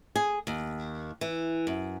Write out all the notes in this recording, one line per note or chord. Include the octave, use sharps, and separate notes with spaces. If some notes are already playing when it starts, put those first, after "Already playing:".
G#4
D#2
E3
F#2